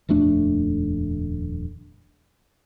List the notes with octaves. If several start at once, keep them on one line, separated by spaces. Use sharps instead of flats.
D#1 F2 A3 D4